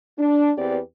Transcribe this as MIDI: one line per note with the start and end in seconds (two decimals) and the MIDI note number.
0.18 0.51 62
0.57 0.79 40
0.57 0.79 60
0.57 0.79 67
0.57 0.79 71
0.57 0.79 74